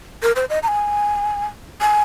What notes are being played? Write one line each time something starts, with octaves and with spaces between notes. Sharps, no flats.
A#4
C5
D#5
A#5
G#5
G#5